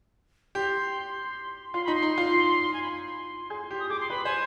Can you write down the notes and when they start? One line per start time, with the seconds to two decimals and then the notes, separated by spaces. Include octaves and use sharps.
0.55 G4 C6
1.74 F4 C6
1.84 D#4 B5
1.95 C6
2.02 D#4
2.18 F4
2.73 G#5
2.83 B5
2.91 C6
3.50 G#4
3.71 G4
3.79 D#6
3.89 G#4 D6
4.00 C6
4.10 B4 B5
4.25 C5 G#5